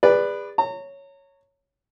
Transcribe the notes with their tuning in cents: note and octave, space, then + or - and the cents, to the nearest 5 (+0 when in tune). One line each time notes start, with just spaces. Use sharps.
G#4 -35 B4 +0 D5 +0
C#5 +0 A#5 -35